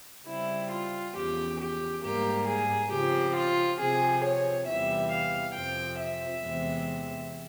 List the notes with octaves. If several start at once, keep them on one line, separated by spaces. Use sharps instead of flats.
C#3 G3 C4 E4
F4
E2 C#3 F3 G4
G4
G#2 G3 A#3 G4
G#4
C#3 F3 C4 G4
F4
C3 F3 C4 G#4
C#5
E2 C3 E3 G3 E5
F5
F2 C3 F3 C4 G5
E5
E2 C3 E3 G#3 C4